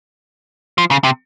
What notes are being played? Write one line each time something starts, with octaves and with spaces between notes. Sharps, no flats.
F3
C#3
C3